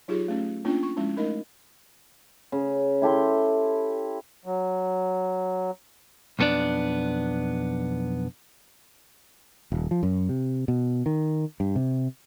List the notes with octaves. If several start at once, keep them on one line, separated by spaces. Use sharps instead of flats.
F#3 D#4 F4 G4 G#4
A3 C#4
A#3 C#4 D4 F4
C#6
F3 G#3 C#4 E4
A3 D#4 A#4 D#5
C#3
E4 G4 A4 C6
F#3
B1 F2 B3 D4 D5
D#1
F3
F#2
C3
B2
D#3
G2
C3